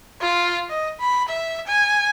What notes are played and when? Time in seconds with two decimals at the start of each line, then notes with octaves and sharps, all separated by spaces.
0.21 F4
0.69 D#5
0.99 B5
1.29 E5
1.67 G#5